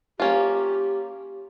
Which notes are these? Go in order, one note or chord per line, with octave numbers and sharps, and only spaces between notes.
A#3 C#4 F4 G4